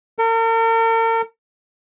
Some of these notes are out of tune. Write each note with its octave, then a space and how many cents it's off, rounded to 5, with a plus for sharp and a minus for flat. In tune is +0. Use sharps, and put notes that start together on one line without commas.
A#4 -45